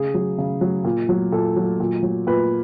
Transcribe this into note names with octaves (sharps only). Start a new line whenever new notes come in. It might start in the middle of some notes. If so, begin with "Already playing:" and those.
Already playing: C#3 G#4
F#3
C#3
F#3
A#2
F#3
A#2 A4
F#3
A#2
F#3
A#2 B4